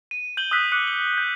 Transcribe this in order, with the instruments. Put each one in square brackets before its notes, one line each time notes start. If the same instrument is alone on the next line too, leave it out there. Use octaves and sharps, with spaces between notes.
[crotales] D#7
G6 F#7 G7
D#6 E6 F#6 B6
D6 D#6 F#6 C#7
F#7
G6